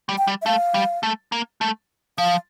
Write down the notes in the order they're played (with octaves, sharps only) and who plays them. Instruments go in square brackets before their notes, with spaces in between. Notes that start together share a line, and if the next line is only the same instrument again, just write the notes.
[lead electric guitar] G3
[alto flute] G5
[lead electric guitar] G3
[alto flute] E5
[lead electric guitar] A3 [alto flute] F5
[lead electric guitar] G3
A3
A#3
A3
[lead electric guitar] F3 [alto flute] F5